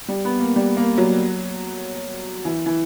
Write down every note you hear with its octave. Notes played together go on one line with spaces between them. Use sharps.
G3
B3
A#3
G3
A#3
F#3
E3
E3